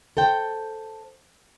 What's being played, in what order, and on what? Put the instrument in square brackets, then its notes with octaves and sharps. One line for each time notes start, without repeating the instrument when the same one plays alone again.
[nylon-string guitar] A4 C5 G5